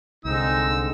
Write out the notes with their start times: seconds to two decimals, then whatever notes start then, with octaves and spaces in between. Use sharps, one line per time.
0.25 C2 D3 G#3 C4 D#4 E6